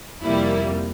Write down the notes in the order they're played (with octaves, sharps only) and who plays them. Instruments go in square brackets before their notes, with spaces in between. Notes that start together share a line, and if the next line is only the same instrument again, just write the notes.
[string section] F2 C3 G3 A#3 E4